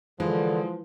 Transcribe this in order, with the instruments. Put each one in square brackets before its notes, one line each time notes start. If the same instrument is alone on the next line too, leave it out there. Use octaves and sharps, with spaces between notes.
[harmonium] D3 [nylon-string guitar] E3 [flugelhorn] F3 [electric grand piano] G#3